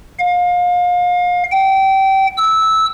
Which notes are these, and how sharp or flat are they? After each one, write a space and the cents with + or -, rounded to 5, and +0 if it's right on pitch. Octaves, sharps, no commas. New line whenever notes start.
F5 +30
G5 -25
E6 -15